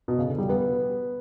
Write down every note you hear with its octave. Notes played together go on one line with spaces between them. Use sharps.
B2
C#3
D3
G3
B3